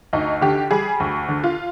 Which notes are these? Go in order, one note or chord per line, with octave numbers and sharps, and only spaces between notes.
D2 D#4
D3 G4
G3 G#4
D2
D3
F4